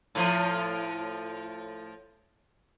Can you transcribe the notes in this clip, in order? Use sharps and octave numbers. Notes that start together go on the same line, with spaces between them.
A2 F3